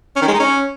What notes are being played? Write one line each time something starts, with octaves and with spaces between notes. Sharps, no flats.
C#4
D#3
G#3
D#4
C#4